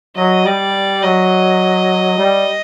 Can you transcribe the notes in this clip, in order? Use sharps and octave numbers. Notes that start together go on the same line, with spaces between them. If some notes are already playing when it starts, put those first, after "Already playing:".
F#3 D#5
G3 D5
F#3 D#5
G3